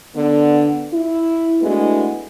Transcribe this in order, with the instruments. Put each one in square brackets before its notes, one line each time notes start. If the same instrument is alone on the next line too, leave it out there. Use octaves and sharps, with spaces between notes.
[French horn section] D3 B3
E4
G#3 A3 B3 D4 E4 F#4